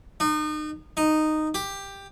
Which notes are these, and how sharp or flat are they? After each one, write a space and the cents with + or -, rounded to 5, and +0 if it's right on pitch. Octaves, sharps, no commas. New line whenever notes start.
D#4 -35
D#4 -10
G4 +10